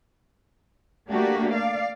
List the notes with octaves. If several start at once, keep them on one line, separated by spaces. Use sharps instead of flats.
A3 A#3 D4 F#4 G4
D5 F5